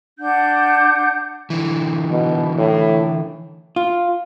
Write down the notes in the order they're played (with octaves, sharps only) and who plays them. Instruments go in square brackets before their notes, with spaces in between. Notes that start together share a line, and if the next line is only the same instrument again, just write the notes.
[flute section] D4 F#5 G6
[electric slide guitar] D3 E3
[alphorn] B2
A2
[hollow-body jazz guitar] F4